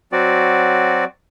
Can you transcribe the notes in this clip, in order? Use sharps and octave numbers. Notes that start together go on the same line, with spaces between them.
F#3 C4 F#4 D5